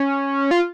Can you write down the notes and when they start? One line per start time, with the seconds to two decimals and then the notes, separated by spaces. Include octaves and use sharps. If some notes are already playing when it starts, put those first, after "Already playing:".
Already playing: C#4
0.51 F4